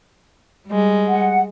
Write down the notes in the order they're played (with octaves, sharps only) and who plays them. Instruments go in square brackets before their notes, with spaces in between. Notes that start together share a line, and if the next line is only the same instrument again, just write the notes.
[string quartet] G3 G#3
[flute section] F#5